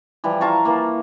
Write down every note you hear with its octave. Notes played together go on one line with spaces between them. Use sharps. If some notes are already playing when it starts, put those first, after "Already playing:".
E3 F3 G3
F4 A5 A#5 C#6
E3 A#3